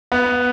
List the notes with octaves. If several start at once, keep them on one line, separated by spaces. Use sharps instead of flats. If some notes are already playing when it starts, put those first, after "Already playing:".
B3